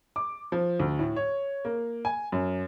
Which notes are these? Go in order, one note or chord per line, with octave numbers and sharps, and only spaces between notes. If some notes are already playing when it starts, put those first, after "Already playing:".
D6
F3
D2
A2
C#5
A#3
G#5
F#2